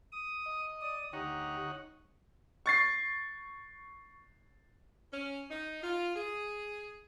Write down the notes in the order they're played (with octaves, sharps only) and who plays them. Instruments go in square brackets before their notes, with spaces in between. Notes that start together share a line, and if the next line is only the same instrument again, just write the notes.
[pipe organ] D#6
[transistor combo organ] D#5
[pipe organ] D5 D#6
[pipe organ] D2 G4 A#5 [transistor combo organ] D#4 C#5 F#5
[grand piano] C#6 A6 C7
[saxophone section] C#4
D#4
F4
G#4